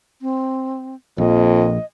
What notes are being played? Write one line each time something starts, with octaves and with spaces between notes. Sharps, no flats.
C4
A#1 F2 A#2 D#5